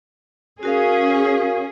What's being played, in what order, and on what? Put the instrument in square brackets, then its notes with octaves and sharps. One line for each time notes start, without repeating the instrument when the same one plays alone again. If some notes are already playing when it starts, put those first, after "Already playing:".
[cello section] C#4 G#4 [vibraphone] F#4 A#4 F5